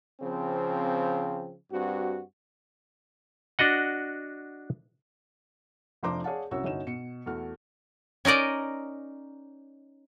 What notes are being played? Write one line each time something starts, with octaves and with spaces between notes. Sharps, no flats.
C#3 F3 C4
G2 C4 F#4
D4 F#4 D#5 F#5
F1 F3 D4 C5 A#5 D6
G#4 C#5 D5 F5 F#5 A5
C2 F#2 F#4 C#5 E6
G1 C#4 D#4 F#4 G#5 E7
B2 C#7
E2 A3 F#4 F6
C#4 D#4 A#4 D5 D#5